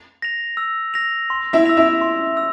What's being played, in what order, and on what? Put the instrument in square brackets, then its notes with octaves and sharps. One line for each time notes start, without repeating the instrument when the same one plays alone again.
[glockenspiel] A#6 F7
E6
A#6 F7
C6
[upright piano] E4 E5
[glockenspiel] E6 A#6 F7
[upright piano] E4 E5
[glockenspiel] C6
E6